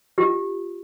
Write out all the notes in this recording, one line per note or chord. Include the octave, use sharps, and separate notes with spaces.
F4 G4